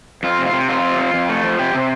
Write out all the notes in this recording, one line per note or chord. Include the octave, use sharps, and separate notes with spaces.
F2 F4
C3
F4
C3
F2 F4
C3
F2
F2
A3
F3
C3 G4
C3